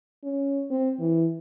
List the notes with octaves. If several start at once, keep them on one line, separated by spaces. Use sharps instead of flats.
C#4
C4
E3